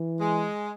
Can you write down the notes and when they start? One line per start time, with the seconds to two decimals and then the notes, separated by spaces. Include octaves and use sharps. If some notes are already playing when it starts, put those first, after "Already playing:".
Already playing: E3
0.20 G#3